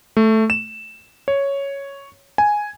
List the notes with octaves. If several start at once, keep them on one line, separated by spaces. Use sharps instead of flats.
A3
E7
C#5
G#5